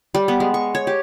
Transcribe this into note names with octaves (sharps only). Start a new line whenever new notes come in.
G3
B3
G#3
C#6
C#5
G4